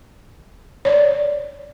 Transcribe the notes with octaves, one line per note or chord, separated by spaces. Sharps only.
C#5 D5